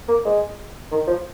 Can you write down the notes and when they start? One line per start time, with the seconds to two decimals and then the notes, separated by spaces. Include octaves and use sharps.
0.08 A#3
0.25 G#3
0.91 D#3
1.07 F3